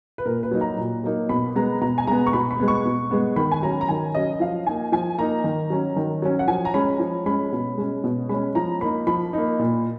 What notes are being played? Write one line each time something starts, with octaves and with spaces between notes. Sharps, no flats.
B4
A#2 A#4
B4
F#3 A#3 D#4
A#5
A#2
F#3 A#3 D#4
B2 B5
G#3 B3 A#5
B2 A#5
G#5
G#3 B3 A#5
C#6
B2 B5
B5
G#3 B3
C#6
B2
G#3 B3
D#3 B5
G#5
F#3 C#4 A#5
A#5
D#3 G#5
F#3 C#4 D#5
D#5
F3 F5
A#3 D#4 G#5
F3 G#5
A#3 D#4 A#5
D#3
F#3 C#4
D#3
F#3 C#4
F#5
F3 G#5
A#5
G#3 C#4 B5
F3
G#3 C#4 B5
B2
G#3 C#4
B2
G#3 C#4 B5
F3 A#5
A#3 D#4 B5
F3 B5
A#3 D#4
A#2